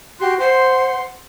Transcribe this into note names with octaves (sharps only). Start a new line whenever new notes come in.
F#4 G4 C6 F#6
C5 F#5 C6